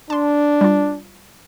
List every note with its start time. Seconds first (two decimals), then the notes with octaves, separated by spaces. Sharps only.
0.10 D4 A5 C6
0.61 G3 F4